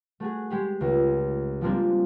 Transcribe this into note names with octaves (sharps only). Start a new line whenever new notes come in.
A3 F#4 G#4
G#3 G4 G#4
C#2
F3 G3 G#3 A#3 C4 D4